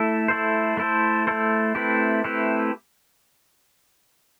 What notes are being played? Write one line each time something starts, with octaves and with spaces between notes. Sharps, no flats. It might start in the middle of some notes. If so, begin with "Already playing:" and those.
Already playing: A3 E4 A4
A3 E4 A4 C5
A3 E4 A4 C5
A3 E4 A4 C5
A3 C4 E4 G4 B4
A3 C4 E4 G4 B4